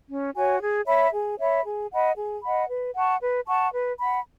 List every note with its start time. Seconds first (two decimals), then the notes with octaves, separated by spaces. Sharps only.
0.09 C#4
0.35 F#4 C#5 G#5
0.60 G#4
0.86 C#5 E5 B5
1.12 G#4
1.39 C#5 E5 B5
1.64 G#4
1.91 D#5 F#5 B5
2.16 G#4
2.42 D#5 F#5 B5
2.69 B4
2.95 F#5 A5 C#6
3.20 B4
3.47 F#5 A5 C#6
3.72 B4
3.99 F#5 B5